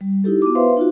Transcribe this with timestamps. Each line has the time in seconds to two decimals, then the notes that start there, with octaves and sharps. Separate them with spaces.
0.01 G3
0.24 D#4 E4 G4 A4
0.42 B3 E4 F#4 D6
0.55 B4 C5 E5 F5 C6
0.77 D#4 F4 F#4